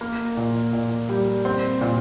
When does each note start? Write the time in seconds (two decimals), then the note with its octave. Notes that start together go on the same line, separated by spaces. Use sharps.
0.01 A#3
0.37 A#2
0.73 A#2
1.09 G3
1.45 C4
1.81 A#2